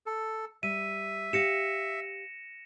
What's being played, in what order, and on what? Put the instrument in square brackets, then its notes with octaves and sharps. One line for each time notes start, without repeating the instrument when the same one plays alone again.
[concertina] A4
[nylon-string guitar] G3 [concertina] E5 [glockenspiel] D#7
[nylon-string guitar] G4 F5 [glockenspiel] A#6 C#7 E7